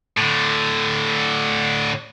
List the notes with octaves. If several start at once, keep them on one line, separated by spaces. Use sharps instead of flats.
A2 D3